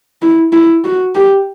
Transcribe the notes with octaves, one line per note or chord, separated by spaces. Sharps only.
E4
E4
F#4
G4